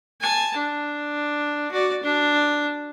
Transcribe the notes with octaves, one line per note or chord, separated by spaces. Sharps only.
G#5 A5
D4
F#4 D5
D4